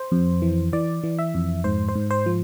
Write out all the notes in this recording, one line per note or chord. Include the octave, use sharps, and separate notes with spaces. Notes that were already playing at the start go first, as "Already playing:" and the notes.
Already playing: C5
F2
E3
E3 D5
E3
E5
F2
G#2 C5
C5
G#2
C5
F3